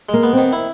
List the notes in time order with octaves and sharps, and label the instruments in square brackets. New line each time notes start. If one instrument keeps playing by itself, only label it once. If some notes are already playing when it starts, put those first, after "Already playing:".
[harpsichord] G#3 [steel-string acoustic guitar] A#3
[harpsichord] B3
[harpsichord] D#3 [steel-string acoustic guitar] C4
[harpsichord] E4